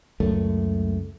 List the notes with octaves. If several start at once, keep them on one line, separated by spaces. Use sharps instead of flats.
C#2 F#2 A3